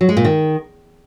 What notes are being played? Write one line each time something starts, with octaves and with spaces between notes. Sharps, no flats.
F#3
G#3
A#2
D#3